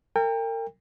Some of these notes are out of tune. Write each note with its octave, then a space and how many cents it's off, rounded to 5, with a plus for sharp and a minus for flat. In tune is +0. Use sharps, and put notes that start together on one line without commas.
A#4 -35 G5 +30